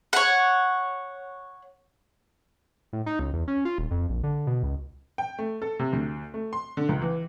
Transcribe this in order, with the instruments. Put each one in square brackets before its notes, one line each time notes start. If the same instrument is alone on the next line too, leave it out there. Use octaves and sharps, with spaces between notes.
[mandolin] C#5 F#5
[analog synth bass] A2
D#4
C#2
E2
C#4
F4
D#1
F2
A#1
D3
B2
C#2
[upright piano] G5
A3
A4
C3
D2
A3
C6
D3
C#2
E3